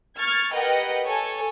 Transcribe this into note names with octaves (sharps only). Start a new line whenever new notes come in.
C#6 F6 G#6 A6
G4 A#4 B4 D#5 F#5 G5
A4 C#5 G#5